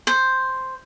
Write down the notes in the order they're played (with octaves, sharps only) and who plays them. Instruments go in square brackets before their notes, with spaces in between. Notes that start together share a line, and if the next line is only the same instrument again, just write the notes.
[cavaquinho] C5